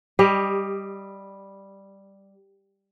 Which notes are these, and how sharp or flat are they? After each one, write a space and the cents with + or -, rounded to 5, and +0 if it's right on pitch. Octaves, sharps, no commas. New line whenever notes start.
G3 +0 G4 +25 D#5 +0